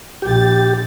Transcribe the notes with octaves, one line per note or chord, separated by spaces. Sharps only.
A#1 G4 A6